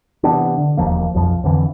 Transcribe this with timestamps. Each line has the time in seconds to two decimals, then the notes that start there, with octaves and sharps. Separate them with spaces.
0.23 C3 E3 B3 D4
0.58 D3
0.77 E1 D#2 F3 A#3
1.14 B1 F2 F3
1.44 F2 D3 E3